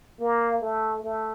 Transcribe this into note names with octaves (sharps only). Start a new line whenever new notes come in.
A#3
A3
A3